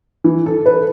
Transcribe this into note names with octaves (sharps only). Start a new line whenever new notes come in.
E3
A4
B4